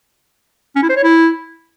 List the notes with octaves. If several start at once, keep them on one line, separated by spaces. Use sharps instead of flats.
C#4
E4
C5
C#5
E4